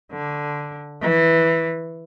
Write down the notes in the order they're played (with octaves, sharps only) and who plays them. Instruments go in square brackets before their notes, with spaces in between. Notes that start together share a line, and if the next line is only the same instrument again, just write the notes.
[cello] D3
E3